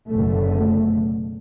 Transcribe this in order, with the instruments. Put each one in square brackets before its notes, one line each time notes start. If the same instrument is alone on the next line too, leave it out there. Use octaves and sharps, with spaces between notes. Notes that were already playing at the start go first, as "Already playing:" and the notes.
[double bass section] F#1 F#2 B2 D3 A3